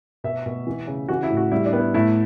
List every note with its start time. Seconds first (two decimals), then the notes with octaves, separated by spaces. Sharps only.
0.24 B2 E5
0.46 B2
0.67 E3
0.87 C#3
1.09 E3 F#4
1.23 E4
1.30 A2
1.37 F#4
1.51 G3 E4
1.66 D4
1.73 B3
1.80 E4
1.94 A2 E4